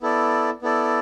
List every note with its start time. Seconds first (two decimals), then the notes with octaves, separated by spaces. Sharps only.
0.02 B3 E4 A4 D5
0.62 B3 E4 A4 D5